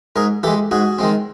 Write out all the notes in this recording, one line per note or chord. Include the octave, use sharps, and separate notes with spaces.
G#2 G#4 A#4
E3 G#3 G4 A4
G#2 F#4 G#4
D#3 G#3 C4